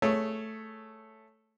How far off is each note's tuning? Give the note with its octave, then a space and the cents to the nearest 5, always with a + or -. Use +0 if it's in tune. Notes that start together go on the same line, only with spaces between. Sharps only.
A3 +0 G#4 +0 C#5 +0